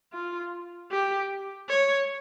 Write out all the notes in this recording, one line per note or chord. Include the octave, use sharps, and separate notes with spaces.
F4
G4
C#5